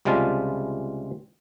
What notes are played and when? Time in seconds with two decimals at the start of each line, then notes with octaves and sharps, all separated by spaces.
0.05 C#2 C3 G3 G#3 F4 A5